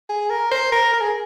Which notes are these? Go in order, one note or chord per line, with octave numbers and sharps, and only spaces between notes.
G#4
A#4
C5
A#4
A#4
G#4